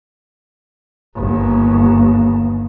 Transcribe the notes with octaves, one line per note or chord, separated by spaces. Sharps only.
G1 D#2